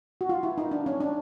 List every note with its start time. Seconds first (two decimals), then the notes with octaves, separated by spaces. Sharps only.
0.21 F#4
0.29 F4
0.43 E4
0.58 D#4
0.71 D4
0.86 C#4
1.00 D4